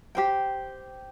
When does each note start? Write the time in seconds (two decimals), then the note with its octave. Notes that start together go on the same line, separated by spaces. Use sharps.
0.15 G4 C5 G5